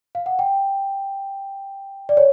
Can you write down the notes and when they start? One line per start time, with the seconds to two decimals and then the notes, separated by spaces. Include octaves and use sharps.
0.15 F5
0.26 F#5
0.39 G5
2.09 D5
2.17 C#5